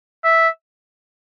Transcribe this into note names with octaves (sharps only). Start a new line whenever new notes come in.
E5